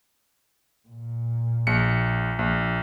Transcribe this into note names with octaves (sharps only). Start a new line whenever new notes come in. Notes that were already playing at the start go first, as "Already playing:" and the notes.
A#2
A#1 C#7
A#1